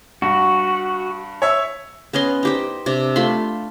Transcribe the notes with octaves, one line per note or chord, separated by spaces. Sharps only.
G2 F#4
C#5 E5 E6
B3 C#4 D#5 C6
D#4 G4 C5
C3 D4
A3 F4 B5 C6